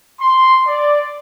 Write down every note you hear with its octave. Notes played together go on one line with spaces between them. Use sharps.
C6
D5